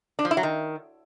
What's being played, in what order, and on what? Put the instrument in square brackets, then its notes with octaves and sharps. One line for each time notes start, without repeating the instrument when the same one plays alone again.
[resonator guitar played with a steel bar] D4
F3
E4
F#3
D#3